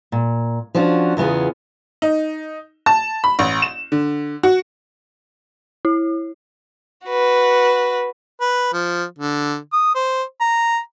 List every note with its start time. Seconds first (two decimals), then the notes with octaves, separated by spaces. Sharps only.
0.12 A#2
0.75 F3 C#4 D4 F4 F#4
1.17 E2 C#3 B3 F4 G#4
2.02 D#4
2.86 A5
3.24 B5
3.39 A1
3.62 E7
3.92 D3
4.43 F#4
5.85 E4
7.07 F#4 B4
8.41 B4
8.73 F3
9.18 D3
9.73 D#6
9.95 C5
10.41 A#5